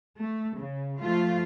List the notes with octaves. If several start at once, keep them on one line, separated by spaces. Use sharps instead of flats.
A3
C#3
F3 A3 F4